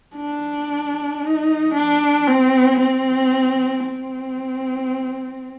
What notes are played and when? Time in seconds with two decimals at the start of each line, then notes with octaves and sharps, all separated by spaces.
0.16 D4
1.23 D#4
1.74 D4
2.28 C4
2.80 C4
3.87 C4